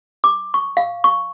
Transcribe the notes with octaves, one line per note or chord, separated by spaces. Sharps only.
D6
C#6
F5
C#6